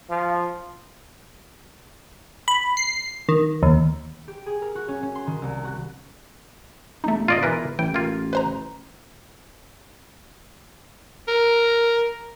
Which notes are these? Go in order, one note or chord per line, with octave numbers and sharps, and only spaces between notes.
F3
B5
C7
D#3
D#2
G4
G#4
A#4
F#4
C#4
C#4
C6
D#3
C2
F#4
E1 A3 D#4
F4 D5 D#5
E3 A#4 B4
A1 E3 G5
A#3 F4
B4 C5 A#5
A#4